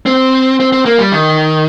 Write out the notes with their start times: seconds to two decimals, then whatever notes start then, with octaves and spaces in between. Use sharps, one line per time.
0.06 C4
0.60 C4
0.72 C4
0.86 A#3
0.99 G3
1.12 D#3